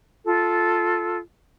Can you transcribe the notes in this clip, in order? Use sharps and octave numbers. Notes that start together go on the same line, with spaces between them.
F4 A4